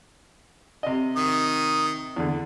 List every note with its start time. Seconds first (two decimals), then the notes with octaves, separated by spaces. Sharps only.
0.83 C3 D#5
1.16 D#3 D#6
2.16 E2 D3